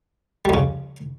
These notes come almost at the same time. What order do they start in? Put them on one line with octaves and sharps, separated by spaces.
G3 F2 C#3